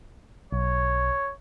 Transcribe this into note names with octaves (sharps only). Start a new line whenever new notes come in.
B1 C#5